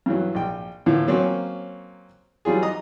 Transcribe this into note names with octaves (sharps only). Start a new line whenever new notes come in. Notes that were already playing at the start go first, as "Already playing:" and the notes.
G2 E3 F#3
A#1 G5
A2 D3 E3 F3 A#3
F#3 A#3 C4 C#4
E3 F#3 G3 F4 G#4
D#5 A#5 D#6